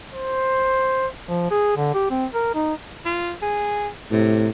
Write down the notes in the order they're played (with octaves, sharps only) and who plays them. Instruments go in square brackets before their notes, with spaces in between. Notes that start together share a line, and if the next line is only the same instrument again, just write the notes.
[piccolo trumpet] C5
[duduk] F3
G#4
D3
G4
C4
A#4
D#4
[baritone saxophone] F4
G#4
[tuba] A2 [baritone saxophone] C3